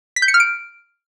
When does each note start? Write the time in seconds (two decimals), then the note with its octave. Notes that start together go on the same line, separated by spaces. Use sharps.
0.16 B6
0.22 G6
0.28 C#7
0.34 F6
0.40 D7